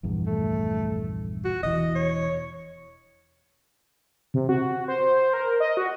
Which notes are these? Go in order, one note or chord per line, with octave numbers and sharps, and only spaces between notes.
A#1 E2 G2
A3
F#4
E1 E3 D#5
C#5
C3
F#4
C5
C5
A#4
D#5
F#4